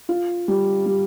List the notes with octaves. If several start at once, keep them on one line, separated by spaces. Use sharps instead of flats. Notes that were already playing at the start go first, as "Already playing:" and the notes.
F4
G3
G3